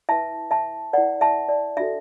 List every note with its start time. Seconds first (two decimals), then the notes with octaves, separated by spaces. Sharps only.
0.09 E4 B4 E5 A5
0.51 E5 A5
0.93 B4 D5 F#5
0.98 E4
1.21 E5 A5
1.49 D5
1.77 D4 F#4 A4 E5